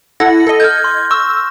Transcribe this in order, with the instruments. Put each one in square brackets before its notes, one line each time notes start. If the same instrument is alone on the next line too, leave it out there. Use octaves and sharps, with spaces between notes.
[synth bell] E4 A4 F#5 [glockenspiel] A#6
[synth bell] A4 D#5
[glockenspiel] F6 G6 [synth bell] G#6
[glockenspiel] C6
[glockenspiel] C#6 [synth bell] E6